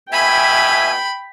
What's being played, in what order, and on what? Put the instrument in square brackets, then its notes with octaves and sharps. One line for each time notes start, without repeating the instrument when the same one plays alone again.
[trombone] B2 [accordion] E5 G#5 [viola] G5 [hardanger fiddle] B5